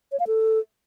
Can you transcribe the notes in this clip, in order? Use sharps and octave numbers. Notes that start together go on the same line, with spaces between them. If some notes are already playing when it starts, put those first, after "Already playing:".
C#5
F5
A4